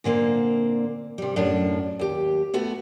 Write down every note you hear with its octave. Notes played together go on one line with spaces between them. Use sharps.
A#2 D3 A#3 C4
C3 G3
F#2 A2 D4 A5
D#2 G4
A3 B3 F#4